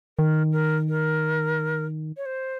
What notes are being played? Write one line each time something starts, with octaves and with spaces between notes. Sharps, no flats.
D#3 A#4
A#4
A#4
C#5
C5